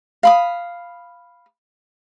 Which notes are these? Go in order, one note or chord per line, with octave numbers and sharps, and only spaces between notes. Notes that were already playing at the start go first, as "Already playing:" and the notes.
F5 B5 D#6